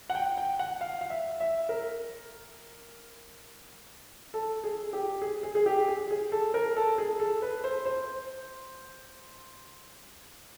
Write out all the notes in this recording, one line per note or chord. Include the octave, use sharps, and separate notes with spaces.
F#5
G5
G5
F#5
F5
F5
E5
E5
A#4
A4
G#4
G4
G#4
G#4
G#4
G4
G#4
G#4
A4
A#4
A4
G#4
A4
B4
C5
C5